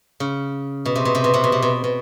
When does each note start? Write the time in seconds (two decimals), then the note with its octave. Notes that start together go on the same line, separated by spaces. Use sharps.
0.20 C#3
0.86 B2
0.96 C3
1.05 B2
1.15 C3
1.24 B2
1.34 C3
1.44 B2
1.52 C3
1.62 B2
1.84 B2